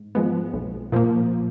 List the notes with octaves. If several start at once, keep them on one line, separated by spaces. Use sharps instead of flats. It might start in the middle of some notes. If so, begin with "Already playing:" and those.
Already playing: G#2
F3 G#3 B3
B1
A#2 F3 A#3